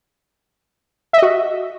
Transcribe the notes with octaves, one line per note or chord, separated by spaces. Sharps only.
F#4 D#5 E5